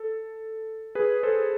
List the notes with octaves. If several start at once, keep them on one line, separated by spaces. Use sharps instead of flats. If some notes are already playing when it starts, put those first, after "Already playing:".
Already playing: A4
G#4 B4
A4 C5